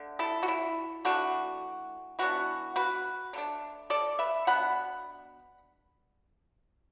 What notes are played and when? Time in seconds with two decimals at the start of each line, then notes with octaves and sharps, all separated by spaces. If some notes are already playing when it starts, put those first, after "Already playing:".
Already playing: D3 A3
0.19 E4 A4
0.43 F#4
0.48 E4
1.05 E3 A3 D4 F#4
2.19 E3 B3 D4 F#4
2.76 F#4 B4
3.33 D3
3.36 A3 D4
3.90 A4 D5
4.19 B4 E5
4.47 B2 B3 D4 F#5 B5